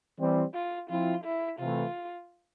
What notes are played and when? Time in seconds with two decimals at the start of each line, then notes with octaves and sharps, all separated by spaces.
0.19 E3 G3 C4
0.54 F4
0.89 F3 C4 E4 F4
1.24 E4
1.59 C3 E3 A3 F4